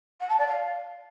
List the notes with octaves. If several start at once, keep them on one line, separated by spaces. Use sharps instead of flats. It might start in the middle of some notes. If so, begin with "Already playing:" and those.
F#5
A5
D5
F5